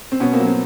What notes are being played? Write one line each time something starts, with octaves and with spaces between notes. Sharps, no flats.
C4
B2 B3 C#4
A#3 C4
F#3
A#3 C4